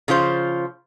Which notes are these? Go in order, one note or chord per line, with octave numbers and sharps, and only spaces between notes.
C#3 F3 F4 C5